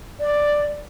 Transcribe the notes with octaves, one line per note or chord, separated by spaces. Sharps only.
D5